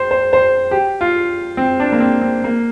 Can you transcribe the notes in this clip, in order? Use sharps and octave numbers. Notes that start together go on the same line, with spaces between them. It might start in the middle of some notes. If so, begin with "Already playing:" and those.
Already playing: C5
C5
C5
G4
F4
C4
D4
A#3
C4
C4
A#3